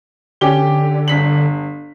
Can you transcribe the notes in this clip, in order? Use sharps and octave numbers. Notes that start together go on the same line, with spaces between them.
D3 C#4 G4 G7
G1 B6 F#7